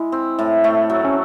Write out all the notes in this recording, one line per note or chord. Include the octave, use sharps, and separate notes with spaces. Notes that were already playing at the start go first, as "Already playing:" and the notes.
Already playing: G#3 E4
C4
A2
A3
F#3
C#4